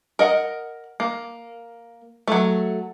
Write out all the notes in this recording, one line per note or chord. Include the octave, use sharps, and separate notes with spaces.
A#4 D#5 F#5
A#3
F#3 A3